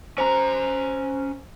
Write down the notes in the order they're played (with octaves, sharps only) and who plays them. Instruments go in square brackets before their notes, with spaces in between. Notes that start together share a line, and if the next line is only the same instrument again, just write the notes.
[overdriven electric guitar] C#4 A#5 [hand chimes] C5